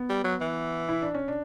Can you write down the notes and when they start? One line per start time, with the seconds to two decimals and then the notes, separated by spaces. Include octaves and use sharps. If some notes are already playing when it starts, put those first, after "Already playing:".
Already playing: B3
0.09 G3
0.24 F#3
0.41 E3
0.89 E4
1.02 D4
1.14 C#4
1.28 D4